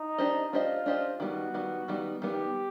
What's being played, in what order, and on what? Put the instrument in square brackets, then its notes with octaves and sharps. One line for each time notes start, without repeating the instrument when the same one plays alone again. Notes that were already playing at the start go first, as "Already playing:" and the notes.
Already playing: [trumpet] D#4
[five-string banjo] D4 G4 C5 D#5
[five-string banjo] D4 G4 C5 D#5 [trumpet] F4
[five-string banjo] D4 G4 C5 D#5
[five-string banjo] D#3 G3 B3 [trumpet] F#4
[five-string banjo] D#3 G3 B3
D#3 G3 B3
[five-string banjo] D#3 G3 B3 [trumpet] G4